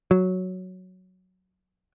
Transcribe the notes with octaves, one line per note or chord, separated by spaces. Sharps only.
F#3